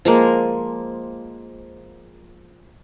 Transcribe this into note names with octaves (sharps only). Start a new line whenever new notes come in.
F3 G#3 A#3